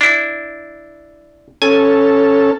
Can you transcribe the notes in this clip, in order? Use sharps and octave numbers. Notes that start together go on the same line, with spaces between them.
D4 E4
C#4 A4 G#5